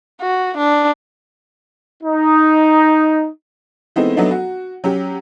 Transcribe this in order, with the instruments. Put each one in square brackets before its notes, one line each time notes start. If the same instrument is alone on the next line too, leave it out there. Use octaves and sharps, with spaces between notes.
[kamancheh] F#4
D4
[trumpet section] D#4
[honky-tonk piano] E3 G#3 A3 B3 C4 D#4
F#3 A3 B3 D4 D#4
F#4
F#3 C#4 G4